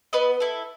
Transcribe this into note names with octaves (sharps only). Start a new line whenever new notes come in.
B3 B4 D#5
E4 A4